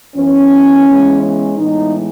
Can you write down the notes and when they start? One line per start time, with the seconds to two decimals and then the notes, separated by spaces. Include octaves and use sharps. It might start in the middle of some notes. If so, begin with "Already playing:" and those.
0.14 F#2 E3 B3 C#4
0.85 C#3 E3 G#3 B3
1.21 C#4
1.56 A2 E3 G#3 B3 D#4